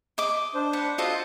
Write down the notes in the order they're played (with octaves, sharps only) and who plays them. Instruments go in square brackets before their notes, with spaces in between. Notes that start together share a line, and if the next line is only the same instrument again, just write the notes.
[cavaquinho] D#5 D6
[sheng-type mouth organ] D4 C5
[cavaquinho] B4 F#5
[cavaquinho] F4 F#4 A4 [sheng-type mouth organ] C5 D#5